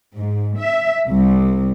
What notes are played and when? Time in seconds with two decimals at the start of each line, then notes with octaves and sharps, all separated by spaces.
0.15 G#2
0.58 E5
1.08 C2